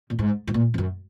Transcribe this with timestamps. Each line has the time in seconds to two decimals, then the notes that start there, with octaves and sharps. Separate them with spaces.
0.10 A#2
0.19 G#2
0.47 G#2
0.54 A#2
0.74 F2
0.78 F#2